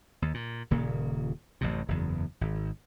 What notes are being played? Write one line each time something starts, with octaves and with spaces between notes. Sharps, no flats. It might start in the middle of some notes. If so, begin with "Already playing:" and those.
D#2
A#2
D#1 A#2 C#3 A#3
A1 F#2 C3
F#1 E2
G#1